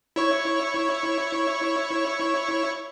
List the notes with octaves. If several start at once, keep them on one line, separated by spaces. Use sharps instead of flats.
E4 C#5 C#6